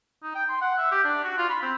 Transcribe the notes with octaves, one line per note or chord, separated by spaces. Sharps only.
D#4
G5
C6
F#5
E5
G4
D4
F#4
F4
B5
C4